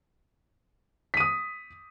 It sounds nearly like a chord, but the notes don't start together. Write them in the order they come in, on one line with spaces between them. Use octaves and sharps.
B6 D#7 D#6